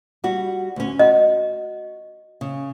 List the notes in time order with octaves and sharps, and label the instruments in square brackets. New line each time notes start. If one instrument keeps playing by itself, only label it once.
[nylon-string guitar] G3 F#4
D2 C#4
[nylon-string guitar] F#4 [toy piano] D#5
[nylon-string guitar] C#3